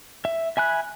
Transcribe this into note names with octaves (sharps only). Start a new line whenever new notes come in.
E5
E5 G#5 B5 F#6